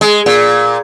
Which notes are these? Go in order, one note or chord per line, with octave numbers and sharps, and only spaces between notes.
G#3
A#2